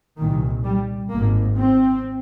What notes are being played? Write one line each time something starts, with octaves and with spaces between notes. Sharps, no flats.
C2 A#2 D#3
G3
G#1 G#2 A#3
C4